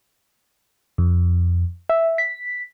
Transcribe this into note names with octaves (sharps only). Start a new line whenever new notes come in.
F2
E5
B6